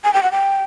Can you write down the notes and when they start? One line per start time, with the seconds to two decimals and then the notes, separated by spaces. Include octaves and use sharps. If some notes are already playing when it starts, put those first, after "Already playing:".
0.04 G#5
0.14 G5
0.23 F#5
0.31 G5